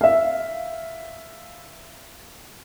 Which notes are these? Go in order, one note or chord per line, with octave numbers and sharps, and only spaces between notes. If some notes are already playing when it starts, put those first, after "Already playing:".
E5 F5